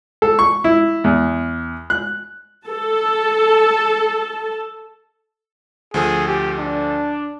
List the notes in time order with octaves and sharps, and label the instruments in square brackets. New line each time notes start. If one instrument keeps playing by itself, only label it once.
[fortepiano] A4
C#6
E4
E2
F#6
[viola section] A4 A5
[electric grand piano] D2 F3 A4 [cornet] G#4
[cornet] G4
D4